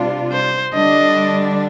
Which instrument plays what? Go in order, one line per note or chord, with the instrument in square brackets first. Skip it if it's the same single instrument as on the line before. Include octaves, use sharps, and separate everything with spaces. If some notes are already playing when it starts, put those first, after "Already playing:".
Already playing: [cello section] C3 G3 D4 F4
[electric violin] C5
[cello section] D3 G3 D4 [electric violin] D#5